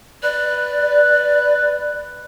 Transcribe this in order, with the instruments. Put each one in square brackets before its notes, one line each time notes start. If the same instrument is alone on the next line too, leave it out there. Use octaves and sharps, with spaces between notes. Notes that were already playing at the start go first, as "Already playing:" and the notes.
[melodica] B4 [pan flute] D5